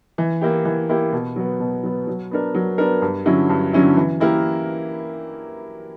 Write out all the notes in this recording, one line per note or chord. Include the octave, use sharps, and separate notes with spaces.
E3
A#3 E4 G4
E3
A#3 E4 G4
B2
F#3 B3
B2
F#3 B3
F#3
B3 D4 A#4
F#3
B3 D4 A#4
G2
D3 F#3 C#4 E4
G2
D3 F#3 C#4 E4
E3
A#3 E4 G4 A#4